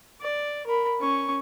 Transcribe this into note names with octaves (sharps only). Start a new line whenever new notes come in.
D5
A#4 B5
C#4 C#6